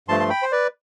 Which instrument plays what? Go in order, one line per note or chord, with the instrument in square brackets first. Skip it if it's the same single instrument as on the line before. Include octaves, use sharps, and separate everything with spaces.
[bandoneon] G2 F3 A3 A5 C6
C6
G5 B5
C5
B4 D5